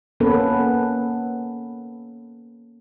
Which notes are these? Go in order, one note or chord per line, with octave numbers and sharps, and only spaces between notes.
A#3 B3 C#4 A4 B4